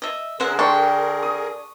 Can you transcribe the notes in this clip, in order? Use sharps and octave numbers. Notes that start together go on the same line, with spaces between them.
D#5 E5
D3 G#4 A#4 C5 E5 F#5
D4 G5 C6 C#6
D#6